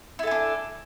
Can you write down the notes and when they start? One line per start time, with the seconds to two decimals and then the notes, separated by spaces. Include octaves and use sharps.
0.19 E4
0.23 A4
0.27 G#5
0.31 D4